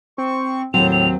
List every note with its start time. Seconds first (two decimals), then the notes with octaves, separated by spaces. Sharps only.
0.18 C4 C#6
0.74 D#2 A2 F#3 C4 F7
0.92 F7